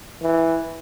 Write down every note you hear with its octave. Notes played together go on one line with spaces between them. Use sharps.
E3